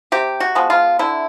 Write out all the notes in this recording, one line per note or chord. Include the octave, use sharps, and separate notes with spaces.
C3 G4
F#4
F3 G#3 B3
F4
D3 E4